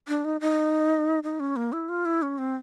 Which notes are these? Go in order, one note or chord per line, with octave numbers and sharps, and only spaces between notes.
D4
D#4
D#4
D#4
C#4
A#3
E4
F4
E4
C#4
C4